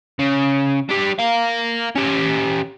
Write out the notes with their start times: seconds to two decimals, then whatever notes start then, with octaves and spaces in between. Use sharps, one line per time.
0.19 C#3
0.89 D4 G4
1.19 A#4 F5
1.96 C#4 G4